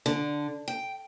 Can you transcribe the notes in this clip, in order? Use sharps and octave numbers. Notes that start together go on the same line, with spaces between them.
D3
G5